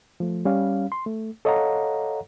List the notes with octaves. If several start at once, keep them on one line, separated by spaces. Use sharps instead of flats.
F3 A3
G3 C#4 F5
C6
A3
A4 C#5 D#5 F5 F#5 A#5